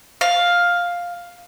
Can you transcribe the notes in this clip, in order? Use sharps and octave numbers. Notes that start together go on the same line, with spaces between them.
F5